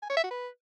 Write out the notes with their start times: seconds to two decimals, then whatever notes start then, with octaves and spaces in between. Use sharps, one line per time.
0.02 G#5
0.10 C#5
0.17 E5
0.24 F#4
0.31 B4